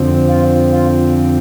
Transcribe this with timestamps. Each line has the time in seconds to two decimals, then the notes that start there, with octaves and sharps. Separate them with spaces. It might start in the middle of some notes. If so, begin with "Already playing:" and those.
Already playing: F2 D3 F3 C4
0.30 F4
0.73 F4